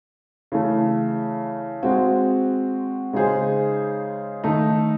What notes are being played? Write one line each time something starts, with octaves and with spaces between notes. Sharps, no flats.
C#3 E3 A3
G#3 C4 F#4
C#3 G#3 D#4 G#4 C5
D#3 A3 D#4